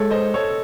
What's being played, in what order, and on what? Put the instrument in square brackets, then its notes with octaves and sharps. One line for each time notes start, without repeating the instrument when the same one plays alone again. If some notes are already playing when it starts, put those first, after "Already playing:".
Already playing: [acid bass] G#3 [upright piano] A4 C#5
[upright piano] C5 D#5
A4 C#5
A4